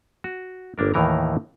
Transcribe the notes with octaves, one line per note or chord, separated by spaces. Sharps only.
F#4
G1 A#3 D4 A#4
D#2 A2 D#3 E3 A#4 A#5